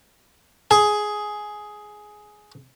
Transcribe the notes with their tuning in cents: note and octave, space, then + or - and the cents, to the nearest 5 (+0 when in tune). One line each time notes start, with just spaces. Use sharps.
G#4 +10